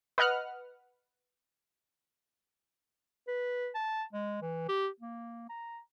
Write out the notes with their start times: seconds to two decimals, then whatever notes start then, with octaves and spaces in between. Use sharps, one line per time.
0.18 B4 D#5 F#5 F6 F#6
3.28 B4
3.75 A5
4.13 G#3
4.42 E3
4.69 G4
5.00 A#3
5.49 A#5